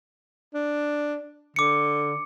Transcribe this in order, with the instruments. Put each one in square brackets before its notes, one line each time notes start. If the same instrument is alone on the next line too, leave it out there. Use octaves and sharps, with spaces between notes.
[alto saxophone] D4
[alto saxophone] D3 [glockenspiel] D6 C#7